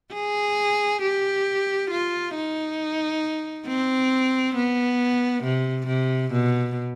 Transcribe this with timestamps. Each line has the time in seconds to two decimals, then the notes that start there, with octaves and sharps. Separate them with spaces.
0.14 G#4
1.02 G4
1.91 F4
2.35 D#4
3.67 C4
4.55 B3
5.43 C3
5.87 C3
6.32 B2